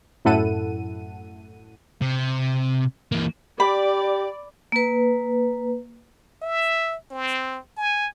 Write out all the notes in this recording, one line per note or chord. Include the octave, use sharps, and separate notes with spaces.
F#2 A2 E4 A4 F#5 D#7
C3
E3 A#3
G4 D5 B5
A#3 B4
E5
C4
G#5